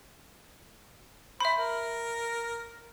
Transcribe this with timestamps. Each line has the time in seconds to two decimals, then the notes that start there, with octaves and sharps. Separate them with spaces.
1.40 C5 E5 B5
1.58 A#4